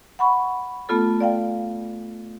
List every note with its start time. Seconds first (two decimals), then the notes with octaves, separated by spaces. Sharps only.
0.19 F#5 B5 C#6
0.89 A3 B3 F4 A4
1.20 D5 F5 G5